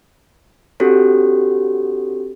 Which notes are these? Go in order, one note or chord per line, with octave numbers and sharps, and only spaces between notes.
C4 D4 F#4 G4 A4 C#5